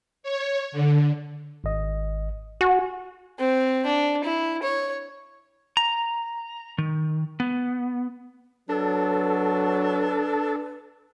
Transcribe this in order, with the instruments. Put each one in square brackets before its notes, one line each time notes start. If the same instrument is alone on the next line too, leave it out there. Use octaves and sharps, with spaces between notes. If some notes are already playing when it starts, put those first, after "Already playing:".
[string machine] C#5
D3
[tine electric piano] G#1 D#5
[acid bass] F#4 [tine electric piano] G#5
[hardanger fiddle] C4
D4
E4
C#5
[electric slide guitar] A#5
D#3
B3
[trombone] F#3 [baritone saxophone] D4 [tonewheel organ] A4 [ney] B4